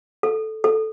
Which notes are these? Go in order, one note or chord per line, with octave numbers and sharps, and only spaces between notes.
A4
A4